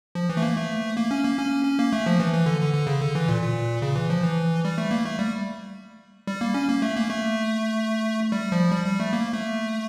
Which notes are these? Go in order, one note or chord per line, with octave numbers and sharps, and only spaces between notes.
F3
E3
A3
A#3
A3
A#3
C#4
A#3
C#4
C#4
A#3
A3
F3
E3
E3
D3
D3
D3
C#3
D3
E3
A#2
A#2
C#3
E3
F3
E3
G3
A3
A#3
A3
G3
G3
A#3
C#4
A#3
A3
A#3
A3
G3
F3
G3
G3
A3
A#3
A3